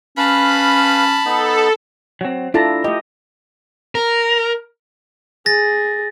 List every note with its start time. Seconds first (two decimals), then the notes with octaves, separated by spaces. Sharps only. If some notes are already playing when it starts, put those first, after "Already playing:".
0.17 C#4 B4 F5 A5 B5
1.26 B3 D#4 A4
2.21 F#3 C4
2.54 D4 E4 F4 A4 A5 A#5
2.84 A3 G4 D#5
3.95 A#4
5.46 G#4 A6 A#6